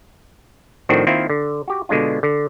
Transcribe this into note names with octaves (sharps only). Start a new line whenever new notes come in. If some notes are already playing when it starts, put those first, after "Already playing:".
A2 D#3 F3 C4 D4 F#4
D#3 A#3 C4 E4 F4
D3
F#4 G4
B2 D3 G#3 D4 F4
D3